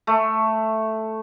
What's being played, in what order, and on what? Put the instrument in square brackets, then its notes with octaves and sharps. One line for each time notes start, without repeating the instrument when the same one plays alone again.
[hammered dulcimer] A3